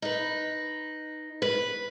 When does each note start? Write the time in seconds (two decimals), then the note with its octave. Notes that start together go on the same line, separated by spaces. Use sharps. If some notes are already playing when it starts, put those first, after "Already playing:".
0.02 D#4 B4
1.42 B4